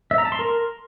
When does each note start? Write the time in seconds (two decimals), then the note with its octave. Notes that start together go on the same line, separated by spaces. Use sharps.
0.11 E5
0.18 A#5
0.25 A5
0.32 C6
0.39 A#4